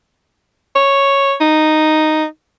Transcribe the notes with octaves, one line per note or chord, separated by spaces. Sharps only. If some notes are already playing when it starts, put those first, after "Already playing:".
C#5
D#4